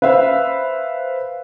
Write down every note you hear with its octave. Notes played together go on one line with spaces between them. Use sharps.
B4 C5 E5 F5